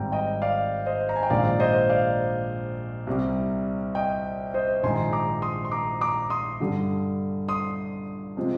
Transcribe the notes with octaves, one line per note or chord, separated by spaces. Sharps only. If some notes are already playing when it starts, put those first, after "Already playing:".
Already playing: G#1 G#2 G3 C4 G5 A#5
D#5 G5
D5 F5
C5 D#5
A#5
G#5
G5
A#1 G#2 D#3 A#3 D5 F5
C5 D#5
D5 F5
C2 C3 G3
D#5 G5
C5 D#5
A#1 G#2 D#3 G#5 C6
A#5 D6
C6 D#6
C6
A#5 D6
A#5 D6
C6 D#6
G2 D3 G3
C6 D#6
C3 F3 G#3 C4